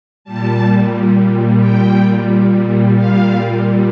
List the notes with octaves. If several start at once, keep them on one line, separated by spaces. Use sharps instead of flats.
A#2 G3 A5
G5
A#2 G3 F5